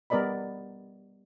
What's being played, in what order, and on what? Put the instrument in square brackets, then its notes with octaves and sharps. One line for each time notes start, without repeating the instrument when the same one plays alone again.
[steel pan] G3 B3 A#4 D5 D#5 B5